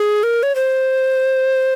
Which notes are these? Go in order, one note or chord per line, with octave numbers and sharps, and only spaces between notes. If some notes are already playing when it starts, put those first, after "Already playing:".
Already playing: G#4
A#4
C#5
C5